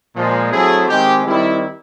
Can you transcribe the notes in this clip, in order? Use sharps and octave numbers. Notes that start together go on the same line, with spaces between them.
A#2 F3 G#3
F#3 A3 C4 E4 G#4
D#3 G#3 C4 G4
D#3 G3 C4 E4